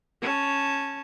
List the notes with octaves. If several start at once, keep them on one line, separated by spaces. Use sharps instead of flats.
C#4 A5